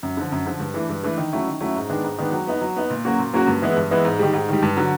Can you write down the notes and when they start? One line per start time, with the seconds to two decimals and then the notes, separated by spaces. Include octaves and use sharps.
0.03 F#2
0.17 D3 F3
0.32 F#2
0.46 D3 F3
0.60 G2
0.74 E3 A3 D4
0.89 G2
1.03 E3 A3 D4
1.18 D#3
1.32 F#3 A3 C#4 E4
1.47 D#3
1.61 F#3 A3 C#4 E4
1.76 G#2
1.90 D#3 G#3 B3 D4
2.04 G#2
2.18 D#3 G#3 B3 D4
2.32 F#3
2.47 B3 D#4
2.61 F#3
2.76 B3 D#4
2.90 A#2
3.05 F#3 A#3 C#4 F#4
3.19 A#2
3.34 F#3 A#3 C#4 F#4
3.47 G2
3.62 E3 G#3 B3 E4
3.77 G2
3.91 E3 G#3 B3 E4
4.05 G#2
4.19 D#3 G3
4.33 G#2
4.49 D#3 G3
4.63 G2
4.77 D3 F#3